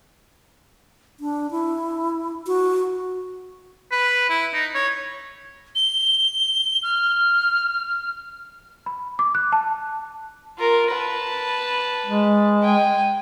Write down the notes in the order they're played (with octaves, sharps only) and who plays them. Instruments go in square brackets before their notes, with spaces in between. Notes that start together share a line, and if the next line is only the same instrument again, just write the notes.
[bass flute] D4
E4
F#4
[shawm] B4
E4
D#4
C#5
[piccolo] G7
F6
[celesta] B5
D6
F#6
A5
[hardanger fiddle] F4 A#4
B4 A5
[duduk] G#3
[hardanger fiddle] G5 G#5